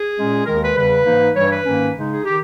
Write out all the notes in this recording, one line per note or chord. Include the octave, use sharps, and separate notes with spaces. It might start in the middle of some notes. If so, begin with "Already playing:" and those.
Already playing: G#4
A#2 G#3 C#4
D#2 D#3 G#3 A#4
B4
E2 C#3 G3 B4
G#2 E3 A#3 D#4
G2 E3 G3 C#5
B4
G#2 D#3 A#3 C#4
C#3 G#3 D#4
G#4
D#3 G4